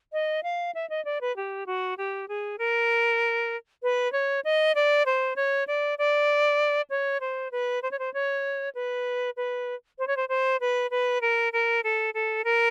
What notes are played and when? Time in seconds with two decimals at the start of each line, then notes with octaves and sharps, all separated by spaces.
0.13 D#5
0.43 F5
0.75 E5
0.90 D#5
1.05 D5
1.21 B4
1.36 G4
1.66 F#4
1.98 G4
2.28 G#4
2.58 A#4
3.83 B4
4.12 C#5
4.45 D#5
4.75 D5
5.06 C5
5.36 C#5
5.67 D5
5.98 D5
6.90 C#5
7.21 C5
7.52 B4
7.83 C5
7.91 C#5
7.99 C5
8.14 C#5
8.75 B4
9.37 B4
9.99 C5
10.07 C#5
10.17 C5
10.29 C5
10.61 B4
10.91 B4
11.22 A#4
11.53 A#4
11.84 A4
12.14 A4
12.44 A#4